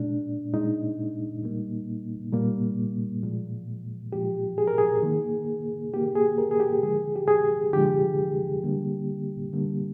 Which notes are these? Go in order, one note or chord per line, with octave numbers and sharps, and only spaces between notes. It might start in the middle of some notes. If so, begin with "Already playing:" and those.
Already playing: A#2 G#3 D4
A#2 G#3 D#4
A#2 G3 A#3
A#2 G3 A#3
A#2 F3 G#3
A#2 F3 G#3 G4
G#4
A#4
G#4
D#3 A#3
D#3 A#3 G4
G#4
A#4
G#4
G4
D3 F3 G#3 G#4
G4
G#4
D3 F3 G#3 G4
D3 G3 A#3
D3 G3 A#3